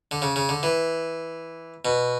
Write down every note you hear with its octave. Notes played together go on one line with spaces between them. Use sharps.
D3
C#3
C#3
D3
E3
B2